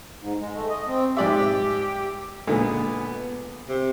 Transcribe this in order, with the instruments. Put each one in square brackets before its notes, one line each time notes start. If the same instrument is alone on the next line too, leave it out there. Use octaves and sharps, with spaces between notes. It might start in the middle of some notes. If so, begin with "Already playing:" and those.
[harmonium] G#2
G#3
A3
D#5
C4
[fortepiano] G#2 D5 E5 [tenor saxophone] G4
[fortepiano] A#2 D3 G#3 [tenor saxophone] B3
[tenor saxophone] C3